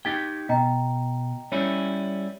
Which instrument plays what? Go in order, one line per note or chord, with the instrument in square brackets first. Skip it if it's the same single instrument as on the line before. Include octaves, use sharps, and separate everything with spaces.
[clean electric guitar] D#4 G4 G5 [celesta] G#6 A6
[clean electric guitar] B2 [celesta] D#5 G5 A#5
[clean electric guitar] G3 C#4 E4 [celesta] C#5